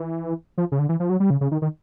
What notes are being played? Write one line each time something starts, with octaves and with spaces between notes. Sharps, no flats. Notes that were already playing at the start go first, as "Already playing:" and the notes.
Already playing: E3
F3
C#3
D3
E3
F3
F#3
G3
C#3
C#3
D#3
D#3